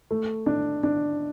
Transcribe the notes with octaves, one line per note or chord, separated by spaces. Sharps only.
A3
D4
D4